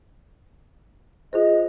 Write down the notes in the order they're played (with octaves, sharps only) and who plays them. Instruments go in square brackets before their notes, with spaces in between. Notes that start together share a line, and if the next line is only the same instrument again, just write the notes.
[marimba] F4 G#4 C5 [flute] D#5